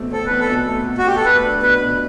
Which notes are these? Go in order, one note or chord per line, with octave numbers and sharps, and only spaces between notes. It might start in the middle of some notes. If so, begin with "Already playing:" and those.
Already playing: E2 B2 A3 C4
C4 A4
E2 B4
A4
B2
A3
B2
F#4
B2 G4
A4
A3 B4
D4
B2 B4
B2